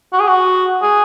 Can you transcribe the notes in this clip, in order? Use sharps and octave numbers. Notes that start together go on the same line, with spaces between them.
F#4
G#4
F#4
G#4